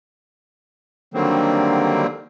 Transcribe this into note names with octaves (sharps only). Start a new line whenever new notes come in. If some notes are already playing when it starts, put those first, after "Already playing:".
D3 D#3 F#3 G3 A#3 C4